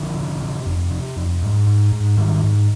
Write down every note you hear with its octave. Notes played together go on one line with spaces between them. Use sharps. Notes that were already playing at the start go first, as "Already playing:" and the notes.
Already playing: D3 F3
C3
C3
F2
C3
F2
G#2
G#2
G#2
G#2 D#3 G3
G#2